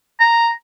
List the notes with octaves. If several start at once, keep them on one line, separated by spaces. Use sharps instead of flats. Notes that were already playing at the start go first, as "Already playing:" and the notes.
A#5